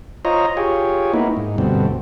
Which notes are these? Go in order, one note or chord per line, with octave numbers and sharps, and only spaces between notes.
F4 C5 C#5 D#5 A#5
F4 G4 G#4 C#5
A#3 B3 D#4 E4
G#2
D2 G2 B2 C4